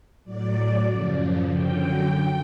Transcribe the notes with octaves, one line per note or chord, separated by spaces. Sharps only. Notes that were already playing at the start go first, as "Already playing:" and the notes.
A2 F#3 D5
F#2 C#3 F3
F#2 D3 F#3 G5